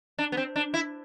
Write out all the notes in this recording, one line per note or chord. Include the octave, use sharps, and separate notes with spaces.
D4
B3
C4
D4
E4